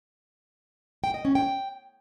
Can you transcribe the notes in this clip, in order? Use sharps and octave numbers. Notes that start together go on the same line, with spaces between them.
G5
D#5
C#4
G5